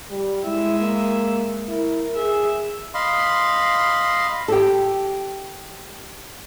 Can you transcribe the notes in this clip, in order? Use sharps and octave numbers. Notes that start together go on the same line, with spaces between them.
G3
G#3 E4 E5
A#3
E4 A#4
G#4 E5
D#5 F5 B5 C6
G4 A4